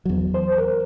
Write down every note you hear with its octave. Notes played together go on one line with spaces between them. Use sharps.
E2 F#3
C5
A#4